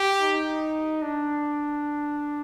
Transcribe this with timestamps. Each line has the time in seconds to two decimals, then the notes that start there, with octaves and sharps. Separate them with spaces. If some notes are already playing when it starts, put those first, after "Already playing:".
Already playing: G4
0.20 D#4
1.02 D4